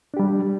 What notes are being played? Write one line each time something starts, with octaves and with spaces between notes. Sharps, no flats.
G3 D4 G4